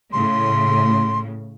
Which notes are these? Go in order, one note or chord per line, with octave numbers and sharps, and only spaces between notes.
A2 C#3 C6